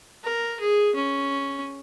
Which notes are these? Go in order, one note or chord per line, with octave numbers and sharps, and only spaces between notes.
A#4
G#4
C#4